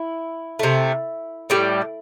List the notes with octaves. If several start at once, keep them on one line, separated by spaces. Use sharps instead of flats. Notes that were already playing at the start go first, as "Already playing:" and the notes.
Already playing: E4
C3 A3
A2 G3